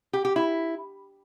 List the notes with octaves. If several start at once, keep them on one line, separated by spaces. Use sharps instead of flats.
G4
G4
E4